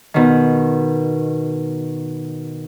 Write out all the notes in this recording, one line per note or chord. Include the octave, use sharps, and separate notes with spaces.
B2 D#3